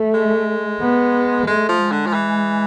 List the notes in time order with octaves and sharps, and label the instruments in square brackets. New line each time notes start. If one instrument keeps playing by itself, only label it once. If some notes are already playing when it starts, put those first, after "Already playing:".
Already playing: [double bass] A3
[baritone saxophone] G#3
[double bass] B3
[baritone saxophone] G#3 [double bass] A3
[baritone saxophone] F3
[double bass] G#3
[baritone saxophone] D3
F3
E3